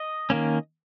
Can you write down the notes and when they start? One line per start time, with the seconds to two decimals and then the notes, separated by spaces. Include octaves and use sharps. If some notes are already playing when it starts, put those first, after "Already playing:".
Already playing: D#5
0.30 D#3 A#3 C#4